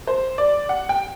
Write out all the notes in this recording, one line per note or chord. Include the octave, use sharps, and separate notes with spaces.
C5
D5
F#5
G5